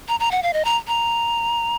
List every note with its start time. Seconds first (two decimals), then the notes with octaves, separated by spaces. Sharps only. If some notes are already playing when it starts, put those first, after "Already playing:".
0.08 A#5
0.20 A#5
0.31 F#5
0.43 F5
0.53 D#5
0.65 A#5
0.88 A#5